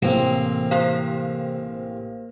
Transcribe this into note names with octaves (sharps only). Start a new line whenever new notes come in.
A1 C3 A#3 C4
G4 C5 F5